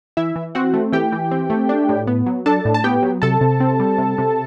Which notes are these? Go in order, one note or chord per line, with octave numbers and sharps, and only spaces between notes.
E3 E4 E5
E3
C4 F#4 F#5
A3
E3 G4 G5
E3
C4
A3
D4
A2
B3
F#3
D4 A4 A5
A2
A5
B3 G4 G5
F#3
C3 A4 A5
C3
C4
G3
C3
C3